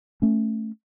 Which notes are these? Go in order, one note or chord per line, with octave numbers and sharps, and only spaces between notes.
A3 C#4